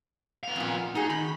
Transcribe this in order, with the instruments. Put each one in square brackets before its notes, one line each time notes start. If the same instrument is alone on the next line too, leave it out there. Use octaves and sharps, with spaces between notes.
[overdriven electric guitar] B3 F5
[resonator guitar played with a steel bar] F2 A#2
[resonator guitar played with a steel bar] A3 F#4 G#4 [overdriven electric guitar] D#4
[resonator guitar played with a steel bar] D#3 [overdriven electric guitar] B5